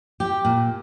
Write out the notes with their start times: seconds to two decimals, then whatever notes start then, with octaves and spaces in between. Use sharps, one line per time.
0.20 G4
0.45 A#2